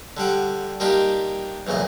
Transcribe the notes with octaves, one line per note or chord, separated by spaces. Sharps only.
D3 G3 F#5 D6
G3 A#3 D4 D#4 F4 G4
B1 E2 A#2 C#3 D#5